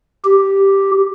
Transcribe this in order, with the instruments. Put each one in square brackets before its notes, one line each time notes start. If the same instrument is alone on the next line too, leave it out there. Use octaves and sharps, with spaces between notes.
[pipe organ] G4